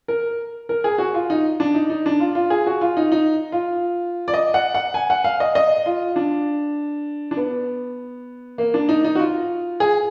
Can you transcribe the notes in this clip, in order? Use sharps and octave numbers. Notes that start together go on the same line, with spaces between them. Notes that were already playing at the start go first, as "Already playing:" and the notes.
A#4
A#4
G#4
F#4
F4
D#4
D4
D#4
D#4
D4
F4
F4
G#4
F#4
F4
D#4
D#4
F4
D5
D#5
F#5
F#5
G#5
F#5
F5
D#5
D#5
F4
D4
D4
B3
A#3
D4
D#4
D#4
F#4
F4
G#4